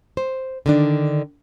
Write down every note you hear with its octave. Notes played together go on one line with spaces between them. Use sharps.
C5
D3 D#3 D4